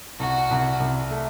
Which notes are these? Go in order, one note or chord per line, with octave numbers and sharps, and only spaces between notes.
C2 F#4
C2
C2
A3